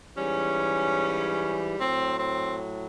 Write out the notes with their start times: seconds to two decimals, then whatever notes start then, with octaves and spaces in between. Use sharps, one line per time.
0.16 G#2 E3 G3 C#4
1.78 A2 F#3 C4
2.19 C4